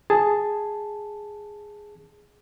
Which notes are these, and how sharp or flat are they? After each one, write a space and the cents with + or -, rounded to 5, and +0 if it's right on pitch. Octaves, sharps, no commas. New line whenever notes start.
G#4 +0 A5 +0